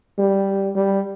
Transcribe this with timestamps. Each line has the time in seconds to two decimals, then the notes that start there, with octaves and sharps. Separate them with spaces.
0.19 G3
0.76 G3